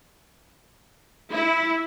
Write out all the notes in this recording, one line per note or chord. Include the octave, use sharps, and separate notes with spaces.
E4